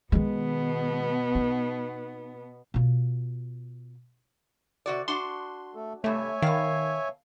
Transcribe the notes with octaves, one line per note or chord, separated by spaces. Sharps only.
B2 D#3 G#3 B3
D#4
B2 F4
C3 F#4 D5
D4 F#4 C6
A3 A4
G2 C3 A3 C#5 E5 G#5
B2 D#3 F5